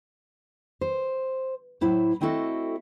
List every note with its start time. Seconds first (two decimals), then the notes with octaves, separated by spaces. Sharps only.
0.81 C5
1.81 A2 F#3 E4 C5
2.21 A3 C4 E4 F#4 A4 D#5